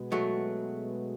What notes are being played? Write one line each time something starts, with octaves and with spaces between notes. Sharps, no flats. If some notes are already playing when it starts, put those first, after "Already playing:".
Already playing: B2 G#3 B3
F#3 A3